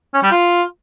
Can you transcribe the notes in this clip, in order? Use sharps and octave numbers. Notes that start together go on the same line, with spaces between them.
C#4
G3
F4